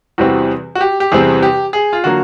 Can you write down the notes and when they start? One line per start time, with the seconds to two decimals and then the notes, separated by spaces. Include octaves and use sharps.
0.18 E2 C3 E3 G3 C4 F#4
0.75 F#4
0.81 G4
1.00 G4
1.12 E2 C3 E3 G3 C4 G#4
1.42 G4
1.73 G#4
1.93 F4
2.04 D3 F#3 A#3 F#4